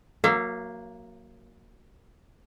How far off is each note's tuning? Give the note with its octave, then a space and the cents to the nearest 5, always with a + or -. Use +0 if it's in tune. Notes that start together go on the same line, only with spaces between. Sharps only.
F#3 -10 A#3 +0 E5 +45